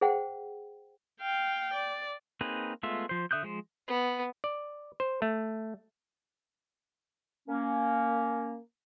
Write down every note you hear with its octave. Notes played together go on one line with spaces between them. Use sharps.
G#4 C5 F#5 G5
F5 G5
D5
A#3 C4 D#4 G#4 B4
G#3 A3 B3 F4 E5
F3 C5
D3 E5 D#6 F#6 G6
F3 G#3 C5
B3
D5
C5
A3
A#3 C#4